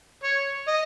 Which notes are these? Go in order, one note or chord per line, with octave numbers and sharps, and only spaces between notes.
C#5
D#5